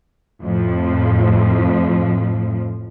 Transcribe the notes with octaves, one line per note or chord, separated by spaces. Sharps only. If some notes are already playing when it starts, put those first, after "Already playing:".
F2 A2 F3